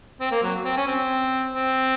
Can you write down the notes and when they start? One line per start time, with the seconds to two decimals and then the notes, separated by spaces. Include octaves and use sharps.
0.21 C4
0.32 A#3
0.43 F#3
0.65 C4
0.77 C#4
0.87 C4
1.54 C4